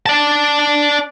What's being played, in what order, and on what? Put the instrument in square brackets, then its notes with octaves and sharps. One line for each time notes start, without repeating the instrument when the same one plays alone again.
[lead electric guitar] D5 A5